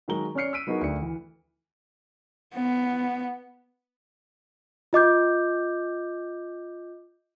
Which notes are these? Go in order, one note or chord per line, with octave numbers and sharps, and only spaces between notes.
D#3 F#3 G#3 A#4 A#5 G7
C#4 C#5 D5 F6 C7 C#7
E6 F6 B6 D7 D#7
F#3 B3 D#4 F#4 G#4 A#4
D2 D4 C#7
E3
B3
F4 D#5 D6 G6